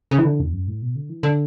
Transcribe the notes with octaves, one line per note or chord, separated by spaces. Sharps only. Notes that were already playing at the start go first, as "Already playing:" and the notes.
C#3
E3
D3
E2
F#2
A2
B2
D3
E3
D3